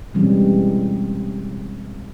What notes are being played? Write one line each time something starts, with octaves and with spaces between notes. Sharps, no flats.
B2 E3 G3 G#3 C4 C#4